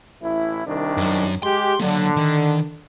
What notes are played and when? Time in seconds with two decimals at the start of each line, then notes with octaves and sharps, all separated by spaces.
0.22 A1 E4
0.66 C2 D#3 D4
0.97 F#2
1.43 G#3 G4 C6
1.80 D3 F#3 A#3
2.16 D#3